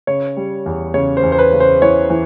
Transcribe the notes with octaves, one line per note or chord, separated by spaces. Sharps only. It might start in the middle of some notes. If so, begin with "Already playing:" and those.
C#3 C#5
G3
E2
C#3 C#5
C5
E2
C5
B4
C#3
C5
E3 C#5
E3